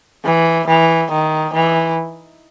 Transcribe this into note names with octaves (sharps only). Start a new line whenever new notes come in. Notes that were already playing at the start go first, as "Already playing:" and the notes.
E3
E3
D#3
E3